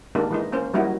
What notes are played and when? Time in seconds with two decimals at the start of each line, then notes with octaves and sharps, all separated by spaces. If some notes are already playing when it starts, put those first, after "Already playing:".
0.15 D#3 G#3 A#3 D4 G4
0.31 E3 G#3 D#4
0.53 A#3 C#4 C5
0.74 F#3 G3 A#3 D#4 E4 F#4